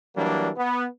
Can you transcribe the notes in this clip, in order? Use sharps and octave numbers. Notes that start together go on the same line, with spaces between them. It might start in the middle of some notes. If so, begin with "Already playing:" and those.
E3 F#3 G3 A#3 D4
B3